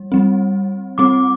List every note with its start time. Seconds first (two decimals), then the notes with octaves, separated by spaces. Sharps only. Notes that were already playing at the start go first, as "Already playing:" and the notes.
Already playing: G3
0.12 G3 C4
0.98 G3 C4 D6